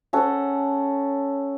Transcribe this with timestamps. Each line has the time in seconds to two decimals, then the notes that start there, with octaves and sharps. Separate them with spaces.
0.13 C#4 A4 F#5